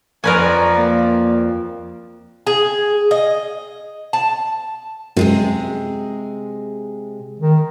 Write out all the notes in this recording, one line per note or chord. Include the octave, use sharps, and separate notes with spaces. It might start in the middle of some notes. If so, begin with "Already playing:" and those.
F2 A#4 B4 D5 G#5 A#5 C#6
A#3
G#4
D#5
A5
F#2 C3 G#3 G#4
D#3